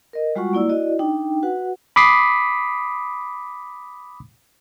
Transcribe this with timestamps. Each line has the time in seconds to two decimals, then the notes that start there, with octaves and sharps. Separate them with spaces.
0.13 A#4 D#5
0.36 G3 G#3 F4 F#4 F#5 C#6
0.53 A#3 E4 D5 E6
0.69 E4 F#4 D5 D#5
0.99 D4 D#4 G5
1.43 F#4 B4 F#5
1.96 B5 D6 D#6 B6 C7